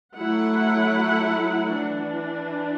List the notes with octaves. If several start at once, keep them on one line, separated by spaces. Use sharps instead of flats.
F#3 A3 E4 F#5
E3 D4